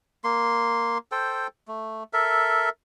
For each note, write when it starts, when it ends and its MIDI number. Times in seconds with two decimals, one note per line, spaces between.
0.24 0.98 58
0.24 0.98 84
1.12 1.47 69
1.12 1.47 72
1.12 1.47 79
1.68 2.03 57
2.13 2.69 69
2.13 2.69 70
2.13 2.69 76